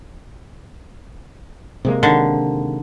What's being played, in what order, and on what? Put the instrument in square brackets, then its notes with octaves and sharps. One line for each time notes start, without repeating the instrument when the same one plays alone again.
[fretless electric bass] C3 G#3 A#3
[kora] D3 D#3